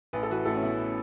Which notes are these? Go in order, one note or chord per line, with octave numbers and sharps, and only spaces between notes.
A1 B4
A4
E3 F#4 B4
A1 E4 A4
C#4
A2 B3 E4
A2